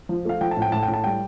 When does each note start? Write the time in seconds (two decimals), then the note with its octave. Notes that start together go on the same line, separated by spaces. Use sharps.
0.09 F3
0.25 A3 F5
0.41 F3 G5
0.51 A5
0.57 A2
0.62 G5
0.72 A2 A5
0.83 G5
0.88 A2
0.94 A5
1.04 G3 G5